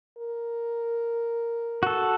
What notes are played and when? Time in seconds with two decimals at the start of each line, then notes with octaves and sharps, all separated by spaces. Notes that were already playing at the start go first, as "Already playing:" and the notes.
0.17 A#4
1.83 F#4 A4